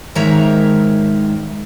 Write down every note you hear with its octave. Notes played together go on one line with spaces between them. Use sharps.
G#2 D#3 G#3 A#4 C#5 E5